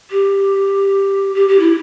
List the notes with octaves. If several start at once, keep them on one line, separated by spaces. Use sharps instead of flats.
G4
G4
G4
E4